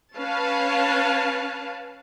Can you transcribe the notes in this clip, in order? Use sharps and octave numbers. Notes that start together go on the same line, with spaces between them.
C#4 B4 F5 A5